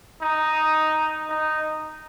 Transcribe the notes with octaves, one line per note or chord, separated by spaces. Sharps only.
D#4
D#4